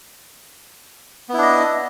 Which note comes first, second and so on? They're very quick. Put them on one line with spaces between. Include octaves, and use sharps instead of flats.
B3 E4 D4 D#5